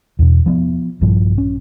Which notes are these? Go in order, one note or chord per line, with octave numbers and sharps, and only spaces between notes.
E2 B2
F3 A#3 B3
A#1 G2 F3
C#4